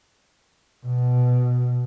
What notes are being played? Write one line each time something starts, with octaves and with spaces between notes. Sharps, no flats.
B2